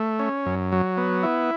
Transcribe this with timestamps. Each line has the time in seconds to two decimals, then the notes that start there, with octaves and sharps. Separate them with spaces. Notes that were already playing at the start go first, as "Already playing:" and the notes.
Already playing: A3
0.19 C#4
0.46 F#2
0.72 F#3
0.97 B3
1.23 E4